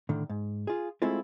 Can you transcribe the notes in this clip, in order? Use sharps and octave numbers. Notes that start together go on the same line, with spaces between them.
A2 D3 D#3
G#2
F4 G#4
G#3 A3 C4 E4 F4